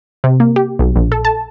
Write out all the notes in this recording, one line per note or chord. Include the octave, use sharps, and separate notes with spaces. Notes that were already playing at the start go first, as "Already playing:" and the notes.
C3
A#3
G4
B1
A#1
A4
A5